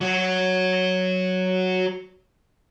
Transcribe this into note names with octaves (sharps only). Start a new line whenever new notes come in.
F#3 F#4